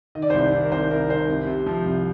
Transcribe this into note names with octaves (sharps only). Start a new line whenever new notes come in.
D#3 D#5
D5
C5
C2 D5
D#3
A#4
C2 C5
C2 A#4
D#3 C5
C2
C3
F3
C2